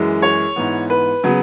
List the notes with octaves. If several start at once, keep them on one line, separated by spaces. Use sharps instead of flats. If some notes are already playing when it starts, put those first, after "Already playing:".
Already playing: F#2 E3 G#3
C#5
G#2 E3 B3
B4
C#3 F#3 B3